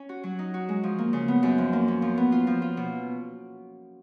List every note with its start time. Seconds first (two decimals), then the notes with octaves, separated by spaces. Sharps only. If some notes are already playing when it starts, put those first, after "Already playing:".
Already playing: C#4
0.09 F#4
0.24 F#3
0.39 D#4
0.54 F#4
0.69 G#3
0.83 F3
0.98 A#3
1.13 C#3
1.28 B3
1.43 F#2
1.58 F3
1.73 A#3
1.88 C#4
2.02 F3
2.18 B3
2.32 F4
2.47 F3
2.62 F4
2.77 B2